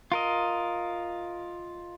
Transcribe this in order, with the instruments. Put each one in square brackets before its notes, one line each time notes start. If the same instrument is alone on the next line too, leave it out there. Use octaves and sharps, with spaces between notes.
[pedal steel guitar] F4 A#4 D#5